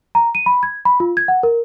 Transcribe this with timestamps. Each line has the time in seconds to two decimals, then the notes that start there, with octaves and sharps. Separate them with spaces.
0.15 A#5
0.35 D#7
0.46 B5
0.63 G#6
0.85 B5
1.00 F4
1.17 G#6
1.28 F#5
1.43 A#4